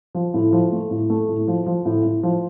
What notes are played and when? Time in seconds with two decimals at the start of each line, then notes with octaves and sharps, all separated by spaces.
0.15 F3
0.34 A2
0.53 F3
0.72 A3
0.91 A2
1.10 A3
1.29 A2
1.48 F3
1.66 F3
1.85 A2
2.04 A2
2.23 F3